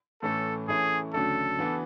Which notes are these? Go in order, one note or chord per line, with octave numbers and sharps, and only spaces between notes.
A2 E3 A3 C#4 A4
E3 A3 C#4 E4 G#4
D2 C#3 F#3 A3 D4 A4
E3 B3 D4 F#4